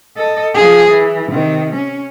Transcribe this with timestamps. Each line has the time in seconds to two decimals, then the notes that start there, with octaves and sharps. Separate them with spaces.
0.17 A4 D#5
0.54 F3 G#4
0.90 E3
1.31 C3 D#3
1.74 C#4